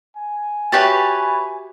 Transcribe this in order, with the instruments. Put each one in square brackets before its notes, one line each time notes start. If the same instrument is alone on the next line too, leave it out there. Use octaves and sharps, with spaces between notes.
[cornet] G#5
[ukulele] F#4 G4 E5 [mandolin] B4 C#5 A5